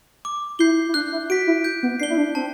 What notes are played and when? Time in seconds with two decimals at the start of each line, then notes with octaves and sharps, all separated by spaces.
0.25 D6
0.59 E4 G6 C7 G7
0.89 E4
0.94 D4 F#6
1.12 E4
1.29 F#4 B6 D7
1.47 E4
1.64 G6
1.83 B3
2.00 D4 C7
2.03 G7
2.10 E4
2.18 D4
2.35 C4 A5